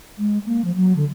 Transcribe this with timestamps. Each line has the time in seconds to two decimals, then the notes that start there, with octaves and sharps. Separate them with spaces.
0.18 G#3
0.46 A#3
0.65 F3
0.75 F#3
0.96 D3